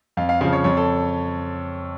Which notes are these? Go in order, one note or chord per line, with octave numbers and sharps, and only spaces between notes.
F2 F5
F5
C#3 F3 F5
C#5
F2 C#5
A4